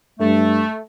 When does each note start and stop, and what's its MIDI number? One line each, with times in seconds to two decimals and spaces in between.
0.20 0.62 43
0.20 0.79 57